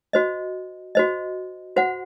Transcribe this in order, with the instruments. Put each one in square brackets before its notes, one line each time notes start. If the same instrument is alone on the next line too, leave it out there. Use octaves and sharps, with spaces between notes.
[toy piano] F#4 C5 D#5
F#4 C5 D#5
F#4 C5 F#5